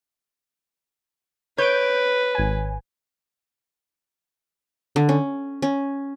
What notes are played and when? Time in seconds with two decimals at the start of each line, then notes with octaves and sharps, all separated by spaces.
1.58 B4 C#5 G6 D7
2.35 G#1 G#5
4.96 D3
5.09 C#4
5.62 C#4